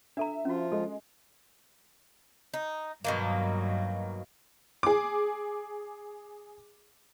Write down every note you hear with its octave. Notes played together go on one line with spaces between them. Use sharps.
D4 A4 E5 A#5
F3 C#4 F4 F#4
G#3 A4
D#4
G2 B2 D#3 F#3 A#3
G#4 D6